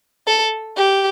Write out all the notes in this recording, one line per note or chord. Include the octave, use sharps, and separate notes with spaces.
A4
G4